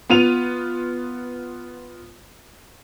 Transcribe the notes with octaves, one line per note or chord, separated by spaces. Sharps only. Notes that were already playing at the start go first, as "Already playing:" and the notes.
B3 F4 D#7 F7